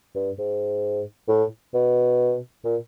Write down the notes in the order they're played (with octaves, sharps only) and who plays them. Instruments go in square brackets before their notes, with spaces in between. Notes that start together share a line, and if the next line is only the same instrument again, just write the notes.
[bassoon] G2
G#2
A2
B2
A#2